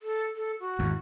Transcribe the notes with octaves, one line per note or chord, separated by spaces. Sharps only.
A4
A4
F#4
G#1 E2